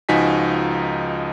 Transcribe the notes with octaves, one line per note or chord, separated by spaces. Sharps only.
C#2 F3 D#4 F#4 G#5 B6